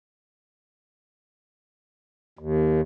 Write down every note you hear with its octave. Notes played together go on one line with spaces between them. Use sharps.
D#2